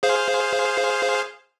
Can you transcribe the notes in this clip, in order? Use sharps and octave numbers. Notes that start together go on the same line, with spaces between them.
G#4 C5 F5